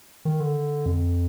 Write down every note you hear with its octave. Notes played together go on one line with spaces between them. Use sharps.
D#3
D3
F2